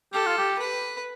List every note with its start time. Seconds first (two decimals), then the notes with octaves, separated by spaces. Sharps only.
0.13 G4 A4
0.26 F4
0.38 G4
0.59 B4